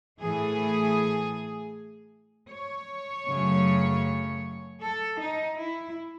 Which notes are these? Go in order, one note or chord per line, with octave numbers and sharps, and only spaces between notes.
A2 E3 A3 G#4
C#5
F#2 C#3 F#3 A3
A4
D#4
E4